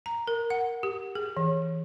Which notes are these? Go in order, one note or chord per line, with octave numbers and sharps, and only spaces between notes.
A#5
A#4
F#5
G4
G#4
E3